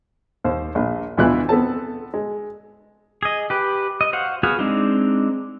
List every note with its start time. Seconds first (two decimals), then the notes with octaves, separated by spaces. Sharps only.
0.44 D#2 C5
0.75 A#1 A#2
1.17 D2 B2 E3 E4 F4 F#6
1.49 B3 C4 A4 A5
2.14 G#3
3.23 G#4 D#5
3.50 G4 B4
4.01 D#5
4.13 F#4 C5 F5 F#5
4.43 B3 F#4 G#4 F5
4.59 G#3 C4 D4 D#4